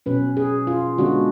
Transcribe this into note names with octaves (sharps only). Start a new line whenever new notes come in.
B2 F#3 C#4 B4
G#4
F4
D3 G#3 B3 D4 F#4